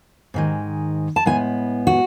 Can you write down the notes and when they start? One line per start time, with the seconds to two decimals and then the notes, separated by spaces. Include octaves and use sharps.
0.34 G#2 D#3 G#3
1.16 A5
1.26 A2 G#3 B3 G#5
1.87 F#4